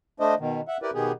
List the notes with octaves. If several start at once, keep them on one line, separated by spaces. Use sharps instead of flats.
A3 D4 C5 D#5
B2 D#3
E5 F#5
E4 G4 A#4 B4 D5
B2 D#3 B3 G4 G#4